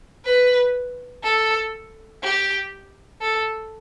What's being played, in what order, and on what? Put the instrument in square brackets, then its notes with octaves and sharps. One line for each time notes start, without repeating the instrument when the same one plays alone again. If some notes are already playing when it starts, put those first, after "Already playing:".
[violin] B4
A4
G4
A4